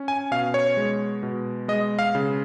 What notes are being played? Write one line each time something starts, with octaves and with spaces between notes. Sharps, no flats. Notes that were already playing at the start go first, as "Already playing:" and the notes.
Already playing: C#4
G#5
B2 F5
C#5
G#3
B2
G#3 D#5
F5
C#3